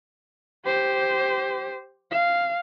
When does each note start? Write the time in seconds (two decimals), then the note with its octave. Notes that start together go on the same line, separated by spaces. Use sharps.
0.65 G4 C5
2.11 F5